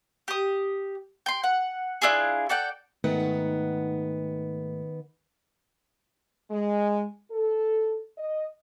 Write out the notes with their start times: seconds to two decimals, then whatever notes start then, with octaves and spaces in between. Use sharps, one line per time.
0.28 G4 D#6
1.26 G5 C6
1.44 F#5
2.02 D4 E4 F4 G#4
2.49 A4 D5 F#5 G5
3.04 G#2 D#3 A3 B3 F#5
6.51 G#3
7.31 A4
8.18 D#5